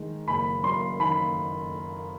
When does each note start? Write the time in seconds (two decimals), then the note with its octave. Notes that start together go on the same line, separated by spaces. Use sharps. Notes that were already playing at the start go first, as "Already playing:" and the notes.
Already playing: D#3 G#3
0.27 F#1 B5
0.63 F#2 C6
1.00 D#3 B5